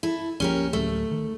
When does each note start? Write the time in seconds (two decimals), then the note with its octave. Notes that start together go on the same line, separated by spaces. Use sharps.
0.03 E4 A4
0.40 C2 F3 A#3 C#4 G4 A#4
0.73 D1 D2 F#3 A3
1.11 D#3